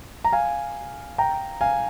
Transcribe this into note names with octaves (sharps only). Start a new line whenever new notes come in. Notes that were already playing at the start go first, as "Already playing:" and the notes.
A#5
F5 G#5
G5 A#5
F5 G#5